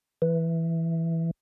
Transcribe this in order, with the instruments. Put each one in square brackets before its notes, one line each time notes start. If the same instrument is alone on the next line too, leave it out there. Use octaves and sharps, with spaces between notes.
[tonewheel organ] E3